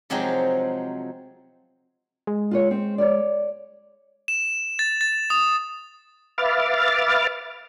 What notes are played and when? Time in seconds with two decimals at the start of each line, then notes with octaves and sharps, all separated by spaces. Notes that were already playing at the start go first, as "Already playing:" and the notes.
0.10 C3 F3 F#3 G#3 C4 D#4
2.27 G#3
2.51 F4 B4 C#5
2.71 C4
2.98 C#5 D5
4.28 E7
4.79 A6
5.01 A6
5.30 D#6
6.38 B4 E5 F5 D6 F6 A6